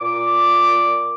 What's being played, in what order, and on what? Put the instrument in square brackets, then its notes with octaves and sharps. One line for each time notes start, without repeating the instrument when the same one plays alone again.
[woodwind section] A#2 D6